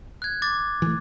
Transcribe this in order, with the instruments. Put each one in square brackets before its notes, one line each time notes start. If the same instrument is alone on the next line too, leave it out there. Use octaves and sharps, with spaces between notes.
[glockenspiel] F#6 G#6
D6 A6
[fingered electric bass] E3 A3